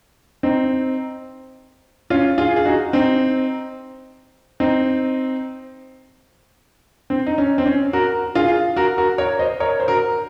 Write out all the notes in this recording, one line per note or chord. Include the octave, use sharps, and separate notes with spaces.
C4 D#4
C#4 F4
F4 G#4
G#4
D#4 F#4
C4 D#4
C4 D#4
C4
D#4
C#4
C4
C#4
F#4 A#4
F4 G#4
F#4 A#4
F#4 A#4
A#4 C#5
C5 D#5
A#4 C#5
C5
F#4 A#4